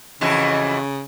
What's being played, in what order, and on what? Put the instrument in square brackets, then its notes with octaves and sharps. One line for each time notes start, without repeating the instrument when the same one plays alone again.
[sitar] F2 E3 F#4 [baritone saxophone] C#3